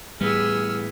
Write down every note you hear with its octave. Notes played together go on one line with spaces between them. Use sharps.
A2 E3 G3 B3 G#4 E6 F6